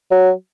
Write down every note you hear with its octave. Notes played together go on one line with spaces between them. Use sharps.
F#3